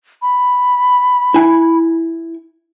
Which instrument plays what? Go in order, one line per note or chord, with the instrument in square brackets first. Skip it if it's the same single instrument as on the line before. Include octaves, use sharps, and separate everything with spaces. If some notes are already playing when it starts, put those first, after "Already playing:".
[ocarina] B5
[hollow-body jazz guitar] E4 G#5